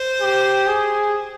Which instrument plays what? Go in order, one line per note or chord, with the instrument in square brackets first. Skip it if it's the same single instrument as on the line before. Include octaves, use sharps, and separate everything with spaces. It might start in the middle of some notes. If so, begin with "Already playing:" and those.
Already playing: [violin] C5
[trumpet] G4
G#4